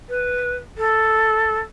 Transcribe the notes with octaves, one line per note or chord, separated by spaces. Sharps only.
B4
A4